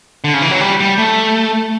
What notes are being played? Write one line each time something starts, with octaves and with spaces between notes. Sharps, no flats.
D3
C#3
E3
F#3
G3
G3
A3